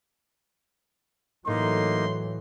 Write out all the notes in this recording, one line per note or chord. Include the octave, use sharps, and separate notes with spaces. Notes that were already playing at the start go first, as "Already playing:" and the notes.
A2 E3 F#3 A#3 D#4 C6